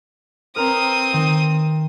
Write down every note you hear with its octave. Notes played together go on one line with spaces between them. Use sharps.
C4 A#4 B4 A#5 D#6
D#3